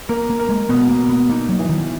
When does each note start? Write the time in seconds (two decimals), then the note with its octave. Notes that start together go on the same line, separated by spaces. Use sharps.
0.09 A#3 A#4
0.30 A#3
0.40 A#4
0.49 G#3
0.69 B2 B3
0.89 A#3
0.99 B2
1.09 B3
1.29 A#3 D#4
1.49 F#3
1.59 E3
1.69 D#3